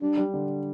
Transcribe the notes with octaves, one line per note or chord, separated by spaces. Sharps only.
G3 D4
G3
D3